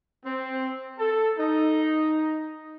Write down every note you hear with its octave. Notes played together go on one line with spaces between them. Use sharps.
C4
A4
D#4